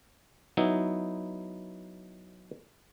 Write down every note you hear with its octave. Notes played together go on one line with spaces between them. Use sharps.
F#3 B3 D#4 E4